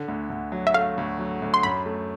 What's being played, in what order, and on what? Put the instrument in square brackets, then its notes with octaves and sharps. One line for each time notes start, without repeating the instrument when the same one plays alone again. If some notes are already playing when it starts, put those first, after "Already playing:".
Already playing: [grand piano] D3
D2
D2
F#3
[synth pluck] E5
[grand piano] A3 [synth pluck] F5
[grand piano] D2
F#3
D2
[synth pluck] C6
[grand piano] F#2 [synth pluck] B5
[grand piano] A3